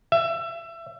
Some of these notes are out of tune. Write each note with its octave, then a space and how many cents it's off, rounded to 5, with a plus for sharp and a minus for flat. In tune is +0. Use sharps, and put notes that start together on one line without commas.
E5 +25